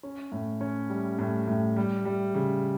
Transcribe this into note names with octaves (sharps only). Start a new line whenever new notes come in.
C#4
A2
C#4
G3
A2
A2
G3
G3
C#3